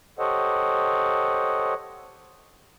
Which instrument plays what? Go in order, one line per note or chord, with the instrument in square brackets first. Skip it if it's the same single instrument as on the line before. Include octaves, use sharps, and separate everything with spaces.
[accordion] G4 A4 C5 C#5 D#5 F#5